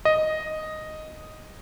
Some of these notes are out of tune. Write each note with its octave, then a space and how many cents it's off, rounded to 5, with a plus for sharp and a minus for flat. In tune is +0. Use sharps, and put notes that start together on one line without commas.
D#5 +0